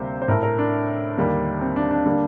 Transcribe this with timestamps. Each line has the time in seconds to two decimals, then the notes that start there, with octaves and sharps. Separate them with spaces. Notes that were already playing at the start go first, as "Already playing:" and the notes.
Already playing: D2 C3 G3 A#3 C5
0.22 C5
0.28 A2 A3 A#4
0.43 A#4
0.58 D4
1.17 D#2 D3 G3 A#3
1.61 C4
1.76 D4
1.91 D4
2.06 D3 G3 A#3